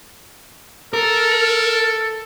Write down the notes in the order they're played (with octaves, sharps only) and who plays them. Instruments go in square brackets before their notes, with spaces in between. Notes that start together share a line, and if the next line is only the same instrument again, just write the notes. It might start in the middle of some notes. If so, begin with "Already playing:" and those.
[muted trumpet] A4 [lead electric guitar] A#4